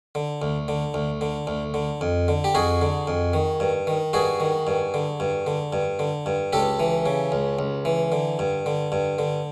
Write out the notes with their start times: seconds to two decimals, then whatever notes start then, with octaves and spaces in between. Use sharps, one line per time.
0.15 D3
0.42 D2
0.68 D3
0.94 D2
1.21 D3
1.47 D2
1.74 D3
2.01 F2
2.28 D3
2.44 G4
2.55 F2 F#4 G#4
2.81 D3
3.07 F2
3.34 D#3
3.60 G2
3.87 D#3
4.13 G2 F#4 G#4
4.40 D#3
4.67 G2
4.94 D3
5.20 G2
5.47 D3
5.73 G2
5.99 D3
6.26 G2
6.53 C#2 G4 A4
6.80 E3
7.06 C#3
7.32 C#2
7.59 C#2
7.85 E3
8.12 D3
8.39 G2
8.66 D3
8.92 G2
9.19 D3